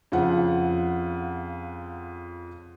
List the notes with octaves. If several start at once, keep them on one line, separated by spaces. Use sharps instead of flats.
F2 C#3 F4 F#5